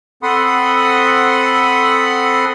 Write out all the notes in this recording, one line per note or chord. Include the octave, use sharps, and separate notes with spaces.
C4 A4 F#5 B5 C6 D#6